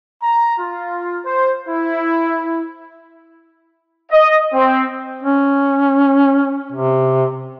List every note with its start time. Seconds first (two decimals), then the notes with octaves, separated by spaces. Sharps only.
0.22 A#5
0.58 F4
1.25 C5
1.68 E4
4.11 D#5
4.54 C4
5.23 C#4
6.72 C3